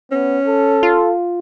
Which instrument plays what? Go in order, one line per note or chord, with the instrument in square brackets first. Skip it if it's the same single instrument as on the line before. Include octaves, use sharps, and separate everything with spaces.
[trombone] B3 [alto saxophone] C#4
[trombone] A4
[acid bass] F4